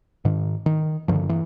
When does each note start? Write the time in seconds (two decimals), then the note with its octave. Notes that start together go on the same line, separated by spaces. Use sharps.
0.25 G#2 D#3
0.66 D#3
1.08 G2 D3 D#3 F3
1.29 E3